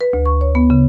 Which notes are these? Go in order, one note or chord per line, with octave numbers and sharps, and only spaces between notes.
B4
D2
C#6
C#5
B3
C#3